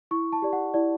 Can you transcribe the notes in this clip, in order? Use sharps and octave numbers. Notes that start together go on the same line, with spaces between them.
E4 C#6
A5
G4 D5
F#5
E4 D5